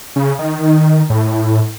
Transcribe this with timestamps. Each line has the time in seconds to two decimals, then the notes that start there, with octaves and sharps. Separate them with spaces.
0.16 C#3
0.39 D#3
1.10 A2